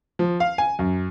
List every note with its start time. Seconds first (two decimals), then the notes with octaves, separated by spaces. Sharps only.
0.19 F3
0.40 F5
0.58 G#5
0.79 F#2